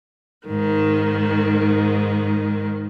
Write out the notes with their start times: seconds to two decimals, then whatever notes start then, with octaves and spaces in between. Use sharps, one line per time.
0.47 G#2 D#3